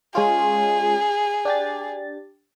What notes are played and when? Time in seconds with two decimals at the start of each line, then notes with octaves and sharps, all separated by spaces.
0.15 G#3 C#4 F4 G#4
1.45 D4 G4 A6